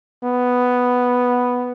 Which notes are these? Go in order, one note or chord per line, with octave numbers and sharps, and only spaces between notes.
B3